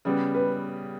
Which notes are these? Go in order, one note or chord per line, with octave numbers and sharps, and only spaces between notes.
C#3 G3 B3
B4